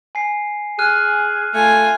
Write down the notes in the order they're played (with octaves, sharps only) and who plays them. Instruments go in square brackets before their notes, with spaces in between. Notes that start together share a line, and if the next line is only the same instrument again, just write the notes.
[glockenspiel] G#5 C7
[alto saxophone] G#4 [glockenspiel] F6 F#6 D#7
[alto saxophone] A3 [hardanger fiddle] F4 G#5